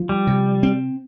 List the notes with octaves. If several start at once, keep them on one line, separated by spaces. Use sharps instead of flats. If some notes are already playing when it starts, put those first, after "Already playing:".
Already playing: F3
G3
C3
C4